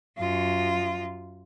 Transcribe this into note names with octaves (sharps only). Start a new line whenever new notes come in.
F#2 F4